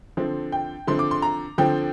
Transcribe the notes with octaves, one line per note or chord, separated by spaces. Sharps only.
D3 F3 C4
G5
D3 F3 C4 C6
D6
C6
A#5
D3 F3 C4 G5